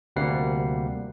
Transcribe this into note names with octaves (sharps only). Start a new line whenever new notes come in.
D2 C3 G3 A#3 F#5 C7